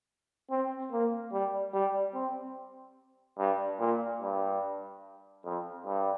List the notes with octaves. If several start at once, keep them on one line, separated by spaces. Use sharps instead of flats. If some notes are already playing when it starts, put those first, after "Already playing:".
C4
A#3
G3
G3
C4
G2
A#2
G2
F2
G2